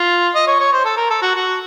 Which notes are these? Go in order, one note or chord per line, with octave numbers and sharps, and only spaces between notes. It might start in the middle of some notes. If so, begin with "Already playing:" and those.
Already playing: F4
D#5
C#5
C#5
C5
A4
A#4
A4
F#4
F#4